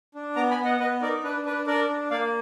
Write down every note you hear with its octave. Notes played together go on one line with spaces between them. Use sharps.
D4
B3 A#5 D6
G#5 B5
B3
D#5 F#5
B3 B4 D#5
D#4 A#4 D5
D4 B4
D4 B4
D4 A#4 D5
D4
A#3 D5 F5